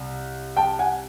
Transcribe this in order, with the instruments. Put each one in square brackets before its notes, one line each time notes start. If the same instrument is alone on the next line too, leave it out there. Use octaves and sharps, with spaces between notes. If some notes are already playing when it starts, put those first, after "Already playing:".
Already playing: [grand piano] C2
G5 A5
F#5 G#5